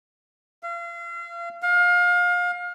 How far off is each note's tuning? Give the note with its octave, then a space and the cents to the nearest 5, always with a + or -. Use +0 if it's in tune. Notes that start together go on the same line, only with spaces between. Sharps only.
F5 -35
F5 +30